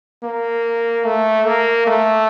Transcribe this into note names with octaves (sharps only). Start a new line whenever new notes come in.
A#3
A3
A#3
A3